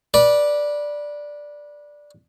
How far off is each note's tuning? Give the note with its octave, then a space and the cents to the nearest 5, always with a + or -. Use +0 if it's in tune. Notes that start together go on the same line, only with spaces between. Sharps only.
B4 -25 D5 +0